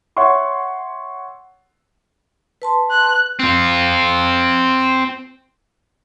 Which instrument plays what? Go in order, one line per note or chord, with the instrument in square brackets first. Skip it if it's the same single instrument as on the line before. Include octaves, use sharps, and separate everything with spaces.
[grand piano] C#5 E5 F#5 C6 C#6
[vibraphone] B4 A5 C6
[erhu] F#6
[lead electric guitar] C4 F4